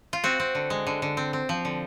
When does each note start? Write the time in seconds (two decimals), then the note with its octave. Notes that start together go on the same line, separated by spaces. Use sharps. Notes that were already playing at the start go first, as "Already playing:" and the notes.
0.13 F4
0.24 C4 F#4
0.40 C4
0.55 D3
0.70 G#3
0.87 D3
1.02 D3
1.17 C4
1.33 C4
1.49 F3
1.65 D3